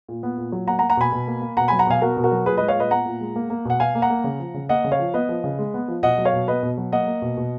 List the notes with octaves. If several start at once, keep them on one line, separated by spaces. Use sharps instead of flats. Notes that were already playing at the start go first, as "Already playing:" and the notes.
A#2
B3
A#2
F#3
A#3 F#5 A#5
F#5 A#5
A#3
F#5 A#5
B2 G#5 B5
B2
A#3
A#3
B2 F#5 A#5
F#3 G#5 B5
F#5 A#5
B2 F5 G#5
B3 F#4 A#4
B2
F#4 A#4
F#3
A#2 G#4 B4
G#3 B4 D#5
C#5 F5
A#2 B4 D#5
B3 F#5 A#5
A#2
G#3
A#3
A#3
B2 F#5
B2 F5 G#5
A#3
F#5 A#5
A#3
C#3
F3
C#3
A#3 D#5 F#5
C#3
C#5 F5
F3
B3 B4 D#5
F3
C#3
G#3
B3
F3
B2 D#5 F#5
F#3
C#5 F5
B2
B3 B4 D#5
B2
F#3
A#3 D#5 F#5
A#3
B2
B2